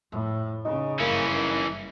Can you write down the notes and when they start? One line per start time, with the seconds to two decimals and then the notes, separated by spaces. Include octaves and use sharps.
0.12 F2 A2
0.65 C#3 D#4
1.00 F#1 G2 E3 A#3 C#4
1.35 D#3